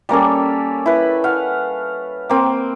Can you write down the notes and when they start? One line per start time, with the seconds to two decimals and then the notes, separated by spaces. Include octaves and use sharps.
0.09 G3 A#3 C#4 A4
0.86 E4 B4
1.24 F5 F#5
2.30 A#3 C4